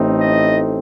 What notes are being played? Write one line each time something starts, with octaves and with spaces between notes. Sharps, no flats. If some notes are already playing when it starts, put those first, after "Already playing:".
Already playing: A1 A2 A3 C4 D#4
D#5